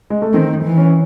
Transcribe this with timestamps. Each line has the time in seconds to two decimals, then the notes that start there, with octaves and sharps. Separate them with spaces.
0.10 G#3
0.22 A3
0.33 D#3 C4
0.63 E3
0.78 C#4